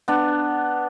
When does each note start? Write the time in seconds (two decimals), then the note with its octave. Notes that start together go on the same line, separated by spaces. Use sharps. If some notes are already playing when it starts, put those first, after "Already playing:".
0.08 B3 D4